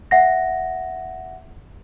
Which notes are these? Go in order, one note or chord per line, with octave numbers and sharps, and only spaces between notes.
E5 F#5 A#6